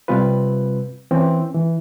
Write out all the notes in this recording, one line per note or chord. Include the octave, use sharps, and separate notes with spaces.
C3 G3 C4 F4 B4
E3 C4 C#4
E3